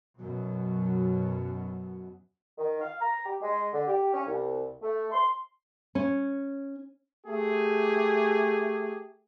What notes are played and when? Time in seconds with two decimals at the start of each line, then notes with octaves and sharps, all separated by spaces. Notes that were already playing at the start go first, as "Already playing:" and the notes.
0.19 F#2 B2 F#3
2.58 D#3
2.82 F5
3.01 A#5
3.26 G4
3.42 G#3
3.73 D3
3.87 G4
4.14 C#4
4.27 C2
4.83 A3
5.12 C6
5.95 C#4
7.27 A3 G4 G#4